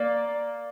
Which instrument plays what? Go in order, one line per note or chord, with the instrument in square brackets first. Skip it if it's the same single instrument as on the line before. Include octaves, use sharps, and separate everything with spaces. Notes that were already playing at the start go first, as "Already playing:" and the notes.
Already playing: [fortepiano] A#3 [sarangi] D5